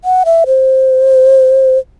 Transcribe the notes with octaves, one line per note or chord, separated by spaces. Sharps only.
F#5
E5
C5